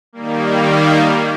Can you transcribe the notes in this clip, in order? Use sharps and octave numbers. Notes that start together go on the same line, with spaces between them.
D#3 G3 A#3